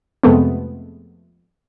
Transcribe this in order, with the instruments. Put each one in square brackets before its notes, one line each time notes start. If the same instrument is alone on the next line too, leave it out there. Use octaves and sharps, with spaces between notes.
[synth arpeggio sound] F2 C3 G#3 A3 B3